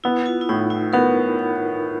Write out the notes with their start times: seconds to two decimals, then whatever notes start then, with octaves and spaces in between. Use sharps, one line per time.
0.04 B3 E4
0.26 F4
0.41 E4
0.49 A2 D#4
0.70 E4
0.93 B3 A#4